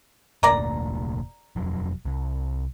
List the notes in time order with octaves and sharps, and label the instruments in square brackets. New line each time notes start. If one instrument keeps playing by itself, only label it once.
[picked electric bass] F1 D2 A#2 [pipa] A#4 D5 A#5
[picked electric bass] E1 F2 F#3
C2